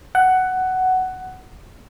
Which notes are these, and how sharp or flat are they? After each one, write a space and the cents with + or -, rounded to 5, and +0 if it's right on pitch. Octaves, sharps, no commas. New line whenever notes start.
F#5 +10